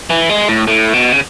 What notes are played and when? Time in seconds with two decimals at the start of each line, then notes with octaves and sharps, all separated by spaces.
0.10 E3
0.30 G#3
0.48 A2
0.67 A2
0.93 B2
1.13 C#3